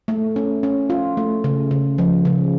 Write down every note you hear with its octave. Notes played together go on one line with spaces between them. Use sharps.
A3
C#4
C#4
F4
A3
C#3
C#3
F3
C#3